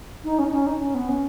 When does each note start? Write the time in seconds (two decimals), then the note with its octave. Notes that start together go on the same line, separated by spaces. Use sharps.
0.24 D#4
0.39 C#4
0.46 D#4
0.53 C#4
0.67 D#4
0.81 C#4
0.95 B3
1.09 C#4